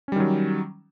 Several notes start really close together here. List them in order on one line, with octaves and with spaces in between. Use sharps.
C#4 G3 D#3 F#3